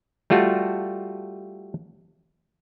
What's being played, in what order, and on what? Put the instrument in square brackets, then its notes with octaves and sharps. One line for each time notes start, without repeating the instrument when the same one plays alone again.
[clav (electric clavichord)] G3 A3 F4 F#4